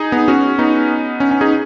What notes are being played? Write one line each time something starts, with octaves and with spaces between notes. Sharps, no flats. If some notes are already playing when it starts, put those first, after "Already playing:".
Already playing: D#4 G#4
B3 D#4
C#4 F#4
B3 D#4
C#4
C#4
D#4 G#4